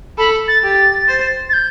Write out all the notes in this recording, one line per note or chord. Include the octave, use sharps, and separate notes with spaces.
A4 B5
A6
G4 A6
C5
A6
G6